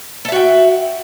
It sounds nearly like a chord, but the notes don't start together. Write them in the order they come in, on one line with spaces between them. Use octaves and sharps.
A4 E5 F#4 G5